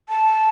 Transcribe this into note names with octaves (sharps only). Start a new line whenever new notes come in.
A5